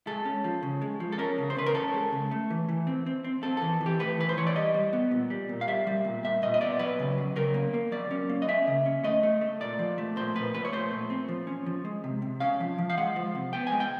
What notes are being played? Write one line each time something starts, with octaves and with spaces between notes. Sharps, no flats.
G#3 A4
C#4
F3
C#3
G#3
F3
A4
C#4 A#4
C#3
C5
C#3 B4
A#4
C#4 A4
G#3
C#3
A3
E3
E3
C4
C4
C4
C4 A4
E3 A4
E3
G4
A3 B4
E3 B4
C5
E3 C#5
D5
G3 D#5
G3
B3
A#2
G3
A#2
F5
G3 E5
G3
A#2
A#2 E5
A#2 D#5
D#5
B3 D5
F#3 B4
C#3
F#3
C#3 A#4
A#3
A#3
F#3 D5
C#4
A#3
D#5
C#4 E5
C#3
C#4
A3 D#5
A3
A3
A#2 D5
F3
A3
A#2 C5
A#2 B4
F3 B4
C#5
A3 C5
A#2
C4
F3
C#4
F3
G#3
C3
C3
C#4 F5
F3
F3
F5
G#3 F#5
F3
C3
B3 G5
G#5
G#3
G5